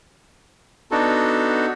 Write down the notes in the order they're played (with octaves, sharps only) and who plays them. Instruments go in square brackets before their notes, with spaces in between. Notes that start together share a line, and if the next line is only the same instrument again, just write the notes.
[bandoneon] B3 D4 D#4 F#4 A4